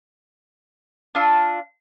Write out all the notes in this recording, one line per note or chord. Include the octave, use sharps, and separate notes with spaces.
D4 F4 E6